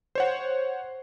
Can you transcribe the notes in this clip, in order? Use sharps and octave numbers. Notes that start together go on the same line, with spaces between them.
C5 C#5 F#5